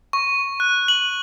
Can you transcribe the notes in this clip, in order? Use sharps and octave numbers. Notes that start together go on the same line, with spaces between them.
C#6
F#6
F#7